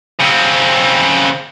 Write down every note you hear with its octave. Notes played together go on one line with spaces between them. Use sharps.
C#3 C4